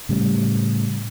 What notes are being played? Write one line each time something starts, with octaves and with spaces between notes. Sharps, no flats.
A2 C#3 G3